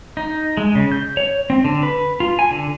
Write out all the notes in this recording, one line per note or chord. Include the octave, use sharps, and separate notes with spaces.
D#4
G#3
C#3
G6
C#5
C4
D3
B4
F4
G#5
D3